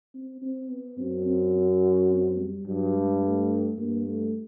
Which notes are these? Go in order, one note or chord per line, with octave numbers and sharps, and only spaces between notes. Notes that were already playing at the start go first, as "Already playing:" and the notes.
C4
C4
B3
F#2 C4
C4
C#4
C4
G3
G2 F#3
G#3
A3
G2 A#3
A3